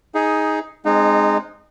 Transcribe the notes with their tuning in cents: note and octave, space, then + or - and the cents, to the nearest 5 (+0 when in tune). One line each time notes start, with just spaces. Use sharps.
D#4 +10 G#4 +0
G#3 +0 C4 +0 D#4 -25